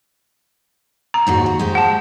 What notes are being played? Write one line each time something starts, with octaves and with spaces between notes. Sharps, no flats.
A#5
D#2 G#2 F#4
F#4
G#3 G4 C5
F#5 A5